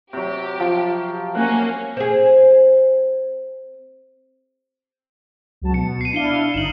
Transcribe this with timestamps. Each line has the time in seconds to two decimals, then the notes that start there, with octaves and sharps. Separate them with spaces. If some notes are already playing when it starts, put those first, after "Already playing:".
0.13 C3 F#3 G4
0.60 F3 G5
1.35 A#3 C#4 F#5
1.97 C4 G#4
5.61 C#2 F#3 A5
5.74 B2 C#7
6.01 C7 D#7
6.13 D4 E4 F5 C#7 D#7 G7
6.54 G1 D#4 E7 F#7